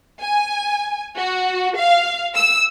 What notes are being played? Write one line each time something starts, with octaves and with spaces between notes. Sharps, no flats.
G#5
F#4
F5
E6